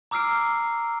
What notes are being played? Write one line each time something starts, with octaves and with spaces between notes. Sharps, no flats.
A#5 D6 E6 F6 C7 D7